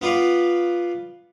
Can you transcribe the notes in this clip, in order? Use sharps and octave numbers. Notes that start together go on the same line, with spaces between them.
B3 F4 B4 D5 F5